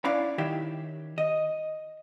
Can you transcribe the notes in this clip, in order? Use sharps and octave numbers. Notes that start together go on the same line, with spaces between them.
C#4 D4 E4 F5 B5
D#3 E4 G4 C#5 E5
D#5